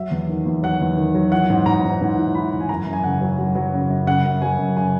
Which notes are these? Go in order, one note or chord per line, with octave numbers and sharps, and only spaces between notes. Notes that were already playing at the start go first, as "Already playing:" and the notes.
Already playing: F#3 E5
E2
D#3
E2
F#3 F#5
E2
D#3
F#3
E3 F#5
G#2
G#2 A#5
G#2
G#2
E3
E3 B5
E3
G#5
F#2 A#5
F#2
G#5
C#3 F#5
F#3
F#3
F#3
C#3
F#2
C#3 F#5
F#2
F#3 G#5
F#2
C#3 G#5